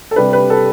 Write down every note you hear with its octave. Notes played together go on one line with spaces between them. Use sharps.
A4
C3 G3 D4 B4
B4
A4